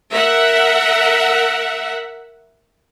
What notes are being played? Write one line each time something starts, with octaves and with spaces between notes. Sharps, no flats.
A#4 E5 F#5